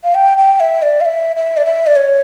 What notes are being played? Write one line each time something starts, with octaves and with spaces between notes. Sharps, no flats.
F5
G5
G5
E5
D5
F5
E5
E5
D5
E5
D5
C#5